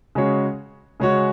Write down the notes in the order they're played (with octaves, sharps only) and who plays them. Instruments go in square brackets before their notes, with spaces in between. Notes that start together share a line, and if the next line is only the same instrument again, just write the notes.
[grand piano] C#3 G#3 C#4 F#4 C#5
C#3 G#3 C#4 F#4 C#5